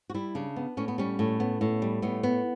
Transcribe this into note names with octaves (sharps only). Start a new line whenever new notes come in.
F#4
G3 E4
C#3 D4
B3
A2 C#4
B3
G3 C#4
A2
B3
A2
G3
A2 B3
B3